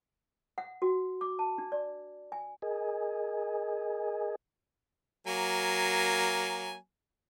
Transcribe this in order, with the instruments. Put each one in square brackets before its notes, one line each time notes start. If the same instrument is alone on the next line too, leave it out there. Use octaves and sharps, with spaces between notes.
[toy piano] F#5
F#4
D6
A5
D4
D5
G#5
[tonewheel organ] G#4 A#4 D#5 G#5
[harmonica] F#3 A#3 G#5